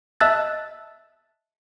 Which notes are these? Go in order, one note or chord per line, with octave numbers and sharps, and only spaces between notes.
D#5 E5 A5 E6 F#6 A6